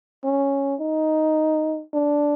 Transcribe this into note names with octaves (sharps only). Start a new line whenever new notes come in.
C#4
D#4
D4